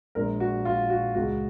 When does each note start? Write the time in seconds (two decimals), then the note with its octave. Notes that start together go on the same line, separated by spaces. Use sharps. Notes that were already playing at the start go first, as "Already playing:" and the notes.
0.15 A#1 A#2 G#3 A#4
0.40 F#4
0.65 F4
0.90 F#4
1.15 C#2 C#3 G#3 F#4